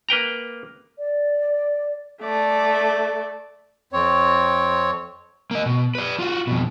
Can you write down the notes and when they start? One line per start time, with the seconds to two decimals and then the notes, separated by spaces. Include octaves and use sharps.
0.09 A#3 B4 G5 A#5
0.99 D5
2.22 A3 D5
3.93 F2 C4 C#5
5.51 A#3 D#5
5.66 B2
5.95 B4 D5
6.19 F4 F#4
6.47 F2 B2